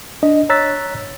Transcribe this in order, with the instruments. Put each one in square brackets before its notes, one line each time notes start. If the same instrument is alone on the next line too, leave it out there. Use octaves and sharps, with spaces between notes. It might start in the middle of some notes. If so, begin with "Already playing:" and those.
[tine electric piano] D4 D#5
C#5 A#5 E6 F#6 A6 B6